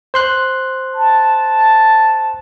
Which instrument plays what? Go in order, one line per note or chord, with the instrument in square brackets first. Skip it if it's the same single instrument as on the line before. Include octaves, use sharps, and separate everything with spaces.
[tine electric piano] C5 C6 F#6
[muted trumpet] A5